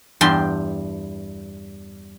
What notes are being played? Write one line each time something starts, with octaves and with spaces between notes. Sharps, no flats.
E2 G2 G5 A5 C6